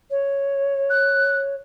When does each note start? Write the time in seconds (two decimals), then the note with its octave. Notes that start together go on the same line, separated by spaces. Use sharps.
0.10 C#5
0.89 F#6